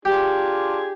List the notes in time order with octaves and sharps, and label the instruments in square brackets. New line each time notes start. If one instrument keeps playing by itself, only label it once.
[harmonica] D4 F4 G#4 [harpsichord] G4